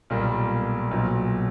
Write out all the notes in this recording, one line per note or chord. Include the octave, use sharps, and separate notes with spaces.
B1 A#2 G3 A#3
B1 A#2 F#3